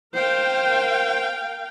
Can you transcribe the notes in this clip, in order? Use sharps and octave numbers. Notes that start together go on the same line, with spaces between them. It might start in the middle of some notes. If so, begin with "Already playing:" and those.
A#4 C5 F5 G5